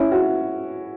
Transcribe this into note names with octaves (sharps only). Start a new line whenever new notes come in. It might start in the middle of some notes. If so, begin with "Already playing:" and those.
Already playing: C#4 E4
F#4